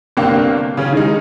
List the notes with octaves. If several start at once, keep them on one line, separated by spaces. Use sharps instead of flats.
G1 C3 A#3 D4 G5
C#3 C#4
D#3 G3 G#3 D#4